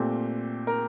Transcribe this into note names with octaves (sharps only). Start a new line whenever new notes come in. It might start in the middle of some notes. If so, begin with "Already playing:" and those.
Already playing: A#2 A3 C4 G4
A#4